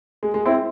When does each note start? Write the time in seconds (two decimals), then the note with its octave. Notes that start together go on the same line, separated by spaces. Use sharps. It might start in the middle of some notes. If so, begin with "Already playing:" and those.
0.23 G#3
0.34 G#3
0.46 C4 E4